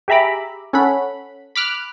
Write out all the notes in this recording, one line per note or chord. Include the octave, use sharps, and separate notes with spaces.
G4 G#4 E5 A#5 B5 D6
C#4 A4 F#5 B5
B5 D6 F6 F#6